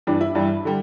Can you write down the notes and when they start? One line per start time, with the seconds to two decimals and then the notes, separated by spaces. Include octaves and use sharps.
0.07 G2 E3 G3 D4
0.21 E4
0.35 G2 E3 G3 E4
0.65 D3 G3